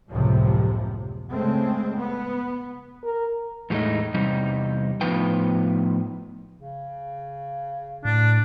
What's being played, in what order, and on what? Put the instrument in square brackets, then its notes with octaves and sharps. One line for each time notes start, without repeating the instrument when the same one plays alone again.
[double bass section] F#1 C#2 A2 C3 F3
C#3 G#3 A3 C4
B3
[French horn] A#4
[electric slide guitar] E2 A2 G#3 A3 D#4
E2 C3 G3 C4 D#4
A2 F3 B3 D#4 B4 G5
[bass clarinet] C#3
[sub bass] A2 [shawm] D4